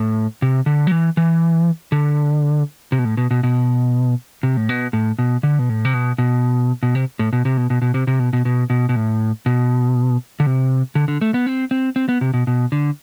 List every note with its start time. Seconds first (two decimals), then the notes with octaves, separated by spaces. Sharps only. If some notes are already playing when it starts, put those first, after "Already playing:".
Already playing: A2
0.42 C3
0.66 D3
0.87 F#3
0.91 E3
1.17 E3
1.92 D3
2.92 C3
2.99 B2
3.05 A2
3.17 B2
3.31 B2
3.43 B2
4.43 C3
4.57 A2
4.69 B2
4.93 A2
5.19 B2
5.43 D3
5.59 B2
5.69 A2
5.85 C3
5.94 B2
6.18 B2
6.83 B2
6.95 C3
7.19 A2
7.33 B2
7.45 C3
7.57 B2
7.70 B2
7.82 B2
7.94 C3
8.07 C3
8.19 B2
8.33 B2
8.45 B2
8.70 B2
8.89 B2
8.96 A2
9.46 B2
10.40 D3
10.46 C3
10.95 D3
11.08 D3
11.21 A3
11.34 B3
11.46 C4
11.71 C4
11.96 C4
12.09 B3
12.21 C3
12.34 B2
12.47 B2
12.72 D3